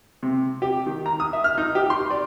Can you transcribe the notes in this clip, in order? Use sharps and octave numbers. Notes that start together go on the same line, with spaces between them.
C3
G4
D#3
A#5
D#6
E5
F6
D#4
G4
C6
D5